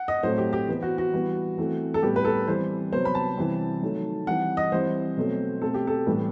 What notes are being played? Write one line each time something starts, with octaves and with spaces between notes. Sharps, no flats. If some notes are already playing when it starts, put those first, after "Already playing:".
Already playing: F#5
D#5
A2 F#3 A3 C4 C5
G4
G4
E3 B3
F#4
F#4
E3 G3 B3
E3 A3 C4
A4
A2 G3 B3 G4
B4
A4
E3 G3 C4 C5
C3 F#3 B3 C5
B5
A5
C3 E3 G3 C4
D#3 F#3 A3
E3 G3 C4 F#5
D#5
E3 G3 C4 C5
B2 F#3 A3 C4
B2 A3 C4 A4
G4
A4
A2 E3 G3 B3